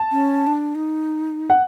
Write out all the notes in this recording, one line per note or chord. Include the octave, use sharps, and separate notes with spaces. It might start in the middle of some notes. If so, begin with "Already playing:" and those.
Already playing: A5
C#4
D4
D#4
F#5